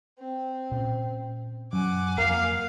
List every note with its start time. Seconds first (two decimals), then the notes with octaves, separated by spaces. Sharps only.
0.19 C4
0.71 A#2 C#4
1.73 F#2 F#5 G#5 D6
2.18 F2 F3 A#3 F5